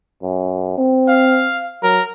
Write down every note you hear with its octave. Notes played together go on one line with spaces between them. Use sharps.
F#2
C4
F5
F#3 A#4